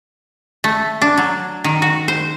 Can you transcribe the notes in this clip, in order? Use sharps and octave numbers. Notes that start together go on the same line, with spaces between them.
A3
D4
F#3
D#3
F#4
C5